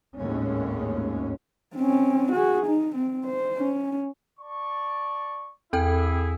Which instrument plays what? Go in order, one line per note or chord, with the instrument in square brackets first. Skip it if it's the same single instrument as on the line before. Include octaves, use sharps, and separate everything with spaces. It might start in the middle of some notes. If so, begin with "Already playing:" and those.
[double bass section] G#1 D#2 A2 G#3 C#4
[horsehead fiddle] C4 C#4
F#4 G#4
D#4
C4
C5
C#4
[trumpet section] D5 A5 C#6
[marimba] E2 [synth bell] C4 A4 G5 [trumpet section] E4 G#4